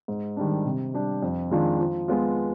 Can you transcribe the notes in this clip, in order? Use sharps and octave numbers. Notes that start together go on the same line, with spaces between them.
G#2
D#3 G3 D4
C3
G3 D4 G4
F2
D#3 G#3 D4 F4
F3
G#3 B3 F4